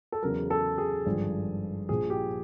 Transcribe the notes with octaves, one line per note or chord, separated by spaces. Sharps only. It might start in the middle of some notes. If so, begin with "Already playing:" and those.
A4
E2 C#3 F#3 A#4
A4
G#4
G#1 G2 D3 F3
A#1 A#2 F3 G#4
G4